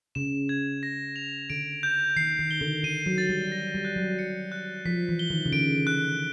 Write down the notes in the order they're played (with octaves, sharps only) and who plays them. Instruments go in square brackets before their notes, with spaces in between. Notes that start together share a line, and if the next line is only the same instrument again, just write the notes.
[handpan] C#3 [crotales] E7
[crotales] G#6
A#6
F7
[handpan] D3 [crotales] D7
[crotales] G6
[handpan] D#3 [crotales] C7
[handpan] D#3
[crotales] G7
[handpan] D3
[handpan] D3 [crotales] D#7
[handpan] F#3
[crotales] A6
[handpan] G3
[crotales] A#6
[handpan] G3
[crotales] F#6
[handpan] F#3
[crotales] C#7
F#6
[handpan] F3 [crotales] B6
[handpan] E3
[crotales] G7
[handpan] D#3
C#3
[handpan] D3 [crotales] D7
[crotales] F#6